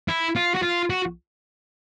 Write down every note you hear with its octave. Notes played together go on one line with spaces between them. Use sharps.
E4
F4
F#4
F4
F#4